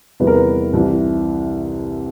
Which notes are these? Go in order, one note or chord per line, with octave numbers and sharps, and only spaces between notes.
E2 C3 E3 G3 B4
A#4
B4
C2 C3 E3